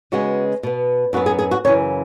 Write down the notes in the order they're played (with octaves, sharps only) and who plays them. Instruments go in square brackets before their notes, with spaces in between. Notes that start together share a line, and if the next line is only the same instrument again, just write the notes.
[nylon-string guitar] C#3 G#3 B3 F#4
B2 B3
F#2 F#3 B3 F#4
G#4
G#4
F#4
F#2 C#3 E3 C#5